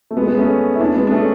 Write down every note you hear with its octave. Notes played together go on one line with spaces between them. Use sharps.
A3
G#3 B3
G#3 B3
A3 C#4
E4
B3 D4
G#3 B3
D4
A3 C#4